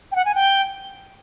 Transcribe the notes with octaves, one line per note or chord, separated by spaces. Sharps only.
G5
F#5
G#5
G5